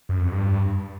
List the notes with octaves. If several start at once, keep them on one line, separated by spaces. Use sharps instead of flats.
F#2
F2
G2